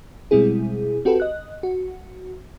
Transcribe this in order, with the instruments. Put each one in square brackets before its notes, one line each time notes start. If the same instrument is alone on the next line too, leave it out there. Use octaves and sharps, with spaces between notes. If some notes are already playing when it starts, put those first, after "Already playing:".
[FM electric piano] B2 G3 G#3 C4 E4 G#4
C4 F#4 G4 A4 B4
D#5 F#6
F#4